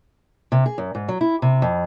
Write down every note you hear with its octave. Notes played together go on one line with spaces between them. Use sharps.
C3
G#4
F#2
G#2
F#3
E4
C3
F2